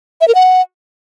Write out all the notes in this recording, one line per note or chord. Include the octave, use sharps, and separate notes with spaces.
E5
A#4
F#5